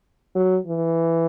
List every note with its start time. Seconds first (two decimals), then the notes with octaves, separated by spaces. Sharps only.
0.35 F#3
0.67 E3